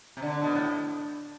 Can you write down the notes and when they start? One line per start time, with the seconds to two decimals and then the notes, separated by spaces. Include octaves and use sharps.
0.17 C3
0.22 D3
0.43 B2
0.55 A2